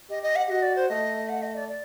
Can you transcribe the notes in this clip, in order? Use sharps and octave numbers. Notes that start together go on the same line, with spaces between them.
G4 D#5
D#5
F#5
F#4 D#5
D5
C5
A3 D#5
F#5
D#5
D5
D5